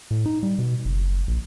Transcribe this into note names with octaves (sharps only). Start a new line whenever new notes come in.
A2
D#4
G3
B2
F#1
A#1